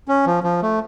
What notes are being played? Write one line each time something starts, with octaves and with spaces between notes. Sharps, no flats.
C#4
F3
F3
A3